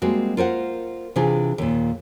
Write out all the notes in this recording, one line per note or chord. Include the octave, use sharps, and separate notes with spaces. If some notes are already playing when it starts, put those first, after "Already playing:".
G3 G#3 A#3 C4 F#4
F4 A#4 C5 F#5
C3 E3 D4 F4 G#4
D#2 A#2